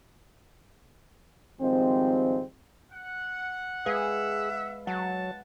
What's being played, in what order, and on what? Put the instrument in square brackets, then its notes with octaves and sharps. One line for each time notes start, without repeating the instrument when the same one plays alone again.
[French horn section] G#2 D#3 F3 G3 C4
[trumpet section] F#5
[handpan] G#3 B4 F5 [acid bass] G#4 [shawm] E5
[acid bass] F#3 [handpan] F#5 [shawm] A5